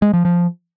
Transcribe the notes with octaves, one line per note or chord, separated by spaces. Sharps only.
G#3
F3
F3